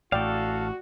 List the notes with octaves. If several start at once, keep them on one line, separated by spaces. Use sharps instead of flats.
A1 A2 F#4 A4 D5 F5 G5